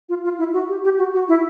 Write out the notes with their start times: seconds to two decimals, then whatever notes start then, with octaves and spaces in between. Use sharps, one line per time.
0.09 F4
0.24 F4
0.38 E4
0.53 F#4
0.69 G4
0.84 G4
0.98 F#4
1.13 F#4
1.28 E4